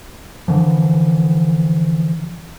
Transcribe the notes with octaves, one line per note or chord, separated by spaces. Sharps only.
D3 E3 F3